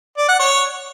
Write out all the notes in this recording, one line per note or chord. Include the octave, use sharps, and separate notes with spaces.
D5
F#5
C#5